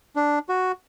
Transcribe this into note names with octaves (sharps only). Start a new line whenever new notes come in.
D4
F#4